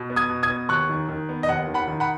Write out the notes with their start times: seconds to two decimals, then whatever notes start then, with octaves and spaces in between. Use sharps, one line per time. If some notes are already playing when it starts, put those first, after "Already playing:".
Already playing: B2
0.10 B3
0.16 D#6 G#6
0.29 B2
0.43 D#6 G#6
0.50 B3
0.69 D#2 C#6 F#6
0.89 D#3
1.08 D#3
1.29 B3
1.43 D#5
1.49 D#2 F#5
1.67 D#3
1.74 F#5 B5
1.88 D#3
2.00 F#5 B5